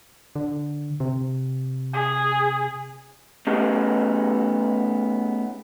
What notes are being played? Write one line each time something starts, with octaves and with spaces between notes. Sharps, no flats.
D3
C3
G#4
A3 B3 C#4 D#4 G4 G#4